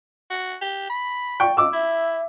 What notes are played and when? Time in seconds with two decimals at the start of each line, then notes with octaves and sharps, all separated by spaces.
0.30 F#4
0.61 G4
0.90 B5
1.40 D5 G5 C#6
1.57 D#5 D6 E6
1.73 E4 E5